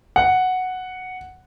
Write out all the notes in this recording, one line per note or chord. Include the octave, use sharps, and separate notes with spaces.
F#5